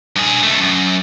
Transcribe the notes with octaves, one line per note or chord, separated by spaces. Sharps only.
G2 G#4
C#2 A3
F#2